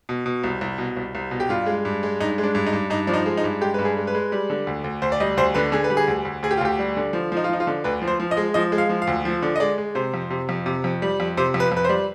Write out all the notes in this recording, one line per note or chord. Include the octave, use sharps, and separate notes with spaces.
B2
B2
C2
C2
B2
C2
C2
B2
G4
G2 F4
G#3
G2
G#3
G2 D#4
G#3
D4
G2
D#4
G2
G2 D#4
F3 D4
D#4
G#3
D#4
G2
G#3 G4
G2 B4
G#4
G#3
B4
G#3
G3
D3
D2
D2
D2 C5
D5
G3 D#5
D2 C5
D3 B4
D3 G#4
B4
G3
G#4
D2
D2
D2 G#4
G4
F4
D2 G4
G3
D3
F3
F3 D#4
F4
F3 D#4
F4
D3
D2 B4
F3
C5
F3
D#5
G#3
F3 D#5
G#3
F5
F3
F5
D2
F3
D3
D#5
G#3 D5
G#3
C3 C5
F2
C3
F2
C3
F2
G3
F2
C3 C5
F2
B4
F2 B4
C5
G3